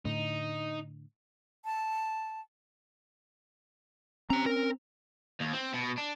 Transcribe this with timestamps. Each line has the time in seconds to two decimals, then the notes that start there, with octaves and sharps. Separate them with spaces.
0.05 A2 D3 A3 D#4
1.65 A5
4.30 C4 C#4 G4 A#5
4.46 A#4
5.41 D#2
5.53 C4
5.74 B2
5.97 D4